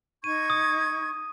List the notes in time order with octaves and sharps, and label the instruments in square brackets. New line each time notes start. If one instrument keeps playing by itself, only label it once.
[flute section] D#4 C#6 G#6 [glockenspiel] D#7
[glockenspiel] D#6